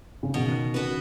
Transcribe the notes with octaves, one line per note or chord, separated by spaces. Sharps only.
C#3
B2 D#3
C#3 B3 F#4 B4